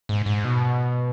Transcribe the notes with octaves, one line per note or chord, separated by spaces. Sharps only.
G#2
G#2
B2